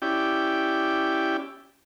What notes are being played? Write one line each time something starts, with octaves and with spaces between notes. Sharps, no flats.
C#4 E4 G4 D5 G5